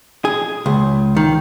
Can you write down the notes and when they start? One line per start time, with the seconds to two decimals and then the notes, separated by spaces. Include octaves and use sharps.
0.25 G#4
0.66 C#2
1.17 D#3